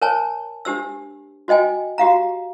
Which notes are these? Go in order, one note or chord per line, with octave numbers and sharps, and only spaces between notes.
A#4 C5 C#5 G#5 A5
D4 G4 C5 E6
F#4 C5 D#5 G5 G#5
F#4 G4 F5 A#5